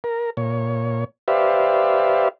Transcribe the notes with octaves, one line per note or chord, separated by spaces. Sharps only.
A#4
A#2 C#5
G4 B4 C5 D5 E5 F5